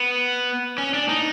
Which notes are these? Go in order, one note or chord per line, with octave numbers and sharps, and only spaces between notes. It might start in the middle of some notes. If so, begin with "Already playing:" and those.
Already playing: B3
C#4
D4
D#4